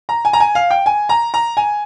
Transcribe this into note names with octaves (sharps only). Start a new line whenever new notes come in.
A#5
G#5
A#5
G#5
F5
G5
G#5
A#5
A#5
G#5